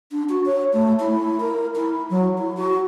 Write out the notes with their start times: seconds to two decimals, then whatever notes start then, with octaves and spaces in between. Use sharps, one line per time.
0.12 D4
0.29 F#4
0.46 C#5
0.73 A3
1.00 E4
1.40 A#4
1.76 E4
2.10 F#3
2.38 E4
2.57 F#4